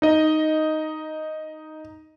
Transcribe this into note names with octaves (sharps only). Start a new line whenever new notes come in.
D#4 D#5